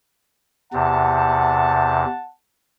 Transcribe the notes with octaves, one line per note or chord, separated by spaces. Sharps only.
E2 C3 F#5 A5